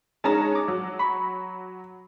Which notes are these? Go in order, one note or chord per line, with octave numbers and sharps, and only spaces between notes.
G#3 C#4 D#4 A5 A#5
D6
F#3
B5 C#6